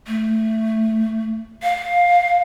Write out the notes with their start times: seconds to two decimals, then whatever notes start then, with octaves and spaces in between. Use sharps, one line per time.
0.07 A3
1.63 F5